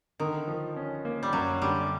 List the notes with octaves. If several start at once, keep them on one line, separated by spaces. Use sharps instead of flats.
D3 D#3
F3
C#4
A#3
G3
F#2 F#3
D3 G3